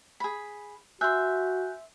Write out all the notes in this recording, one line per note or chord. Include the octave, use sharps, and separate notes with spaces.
G#4 B5
F#4 E5 G#5 C6 F#6 G6